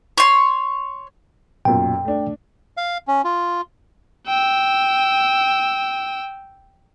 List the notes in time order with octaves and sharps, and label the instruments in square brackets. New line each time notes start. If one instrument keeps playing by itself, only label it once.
[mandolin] C#5 C6
[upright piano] B1 F#2 A#2 [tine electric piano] G5
[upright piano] A3 D4
[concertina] F5
C#4
F4
[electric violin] G5 E6